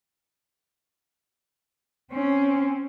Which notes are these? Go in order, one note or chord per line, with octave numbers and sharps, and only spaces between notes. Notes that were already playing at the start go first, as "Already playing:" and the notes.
C4 C#4